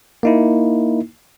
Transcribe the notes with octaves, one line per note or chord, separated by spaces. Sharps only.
A#3 D#4 E4